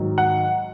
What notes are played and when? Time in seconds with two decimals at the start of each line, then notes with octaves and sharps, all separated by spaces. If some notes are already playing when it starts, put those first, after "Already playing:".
Already playing: G#2 D#3 F#3
0.18 F#5